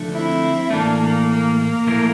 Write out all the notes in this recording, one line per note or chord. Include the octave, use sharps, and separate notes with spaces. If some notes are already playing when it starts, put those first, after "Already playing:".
Already playing: D3 F3 A3 D4
C4 E4
A2 E3 A3 A#3 D4
A#3
A#3
A#3
A#2 F3 A3 E4 A#4